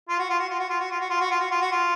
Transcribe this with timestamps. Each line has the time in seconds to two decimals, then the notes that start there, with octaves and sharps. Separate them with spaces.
0.09 F4
0.19 F#4
0.29 F4
0.39 F#4
0.49 F4
0.59 F#4
0.69 F4
0.80 F#4
0.91 F4
1.00 F#4
1.10 F4
1.20 F#4
1.31 F4
1.40 F#4
1.51 F4
1.61 F#4
1.71 F4